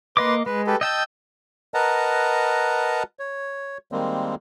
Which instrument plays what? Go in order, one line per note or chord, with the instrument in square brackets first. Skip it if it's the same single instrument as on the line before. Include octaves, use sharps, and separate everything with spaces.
[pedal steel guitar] A#3 D#5 D6 [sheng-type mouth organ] B4 C6
[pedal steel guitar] G#3 [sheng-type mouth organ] B4
[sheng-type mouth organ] G4 A4 B4
[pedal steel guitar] D#5 G5 A5 [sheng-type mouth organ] E6 G6
[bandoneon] A#4 B4 D#5 F#5 A5 A#5
C#5
D#3 G3 G#3 A#3 C4